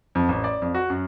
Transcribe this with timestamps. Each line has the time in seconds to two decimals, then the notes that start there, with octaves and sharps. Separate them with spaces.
0.15 F2
0.29 A1
0.44 D5
0.62 F2
0.74 F#4
0.90 F#2